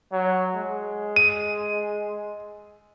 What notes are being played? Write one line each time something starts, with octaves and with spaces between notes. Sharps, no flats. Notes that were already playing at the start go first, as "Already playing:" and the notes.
F#3
G#3
D#7